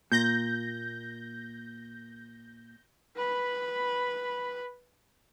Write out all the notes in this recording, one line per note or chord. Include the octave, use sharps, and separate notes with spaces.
A#2 G6 A#6
B4 B5